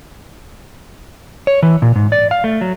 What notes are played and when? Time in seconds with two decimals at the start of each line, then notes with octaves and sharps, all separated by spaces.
1.47 C#5
1.63 E3
1.82 A#2
1.96 G#2
2.12 D5
2.31 F5
2.44 A3
2.61 F#3